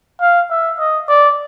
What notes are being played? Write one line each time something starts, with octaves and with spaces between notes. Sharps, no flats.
F5
E5
D#5
D5